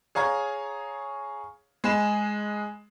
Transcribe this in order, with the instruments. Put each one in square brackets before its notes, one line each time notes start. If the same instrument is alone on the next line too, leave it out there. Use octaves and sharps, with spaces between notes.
[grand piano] G#4 C#5 F5 A#5 G#6
G#3 G#4 B5 E7